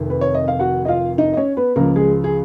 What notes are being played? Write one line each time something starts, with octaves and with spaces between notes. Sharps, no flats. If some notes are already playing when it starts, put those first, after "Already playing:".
Already playing: F1 F2 D#3
B4
C#5
D#5
F5
F#4 F#5
D#5
F4 F5
D#4 D#5
D#5
C#4 C#5
B3 B4
C#2 C#3 F3 A#3 A#4
G#3 G#4
G#4